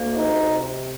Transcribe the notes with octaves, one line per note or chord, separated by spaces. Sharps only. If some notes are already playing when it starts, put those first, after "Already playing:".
Already playing: D2 A#3
C3 D#4
C3